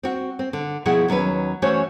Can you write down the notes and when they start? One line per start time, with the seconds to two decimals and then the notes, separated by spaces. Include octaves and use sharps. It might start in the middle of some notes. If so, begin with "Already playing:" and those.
0.03 C4 F#4
0.39 C4
0.53 D3
0.86 B2 F3 E4 G#4 F#5
1.08 D#2 F#3 C#4 B4
1.62 E3 A3 C#4 F#4 C5 C#5